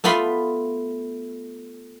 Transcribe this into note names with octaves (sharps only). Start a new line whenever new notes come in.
A3 B3 F4 B5 C6